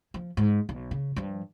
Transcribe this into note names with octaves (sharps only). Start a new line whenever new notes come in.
F3
G#2
B1
C#3
G2 F3